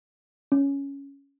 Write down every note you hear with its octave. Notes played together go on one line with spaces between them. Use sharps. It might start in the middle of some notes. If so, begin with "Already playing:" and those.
C#4